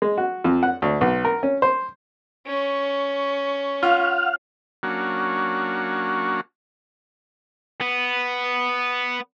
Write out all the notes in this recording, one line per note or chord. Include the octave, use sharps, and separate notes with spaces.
G#3
F#4
F2
F#5
D2
B1
A#4
C#4
C5
C#4 C#6
F4 F5 F#5 F6
F#3 A#3 C#4 D4 F#4
B3